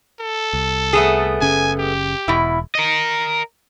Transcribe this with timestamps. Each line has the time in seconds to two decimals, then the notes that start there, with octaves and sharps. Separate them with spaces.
0.20 A4
0.53 C2
0.93 A3 B3 G#4
1.41 F#1 C#3 C#4 G#5
1.79 G4
2.28 E1 B2 E4
2.75 A#4 D#5